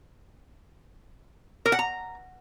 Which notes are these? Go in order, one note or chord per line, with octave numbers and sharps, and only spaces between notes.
A#4
F#5
A#5